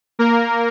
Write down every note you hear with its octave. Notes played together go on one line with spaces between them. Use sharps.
A#3 A#4